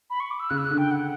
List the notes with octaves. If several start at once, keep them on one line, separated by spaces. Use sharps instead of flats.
B5
C#6
D6
E6
C#3 F#6
E6
F#6
D3
G5
F#5